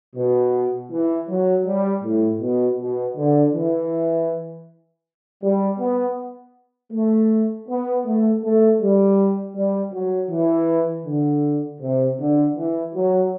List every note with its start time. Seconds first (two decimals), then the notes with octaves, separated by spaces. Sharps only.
0.16 B2
0.91 E3
1.29 F#3
1.66 G3
2.03 A2
2.41 B2
2.79 B2
3.17 D3
3.55 E3
5.42 G3
5.79 B3
6.92 A3
7.68 B3
8.05 A3
8.43 A3
8.81 G3
9.55 G3
9.93 F#3
10.30 E3
11.06 D3
11.81 C3
12.19 D3
12.56 E3
12.94 F#3